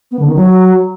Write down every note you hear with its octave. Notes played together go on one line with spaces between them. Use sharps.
B3
D3
D#3
F#3